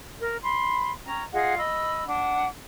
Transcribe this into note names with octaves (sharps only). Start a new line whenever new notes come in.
A#4
B5 C6
C#4 G5 A#5
F4 G#4 D#5 F#5
D#5 B5 E6
D4 F#5